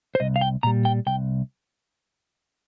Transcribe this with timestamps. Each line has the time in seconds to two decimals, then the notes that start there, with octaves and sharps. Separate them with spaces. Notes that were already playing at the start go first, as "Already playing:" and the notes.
0.15 C5
0.20 C2 D#5
0.36 F5
0.41 G5
0.63 A#2 G3 A#5
0.85 G5
1.07 C2 G5